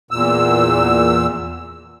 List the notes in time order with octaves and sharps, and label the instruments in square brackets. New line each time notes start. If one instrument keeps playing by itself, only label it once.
[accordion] E2 A#2 E6